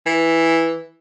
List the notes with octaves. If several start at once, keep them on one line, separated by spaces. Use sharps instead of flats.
E3